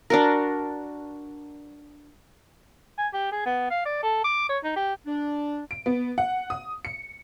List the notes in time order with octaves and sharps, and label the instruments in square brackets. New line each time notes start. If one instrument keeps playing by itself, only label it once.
[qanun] D4 F#4 A#4
[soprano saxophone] G#5
G4
G#4
B3
F5
D5
A4
D6
C#5
D#4
G4
[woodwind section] D4
[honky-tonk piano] D7
B3
F#5
D#6
C#7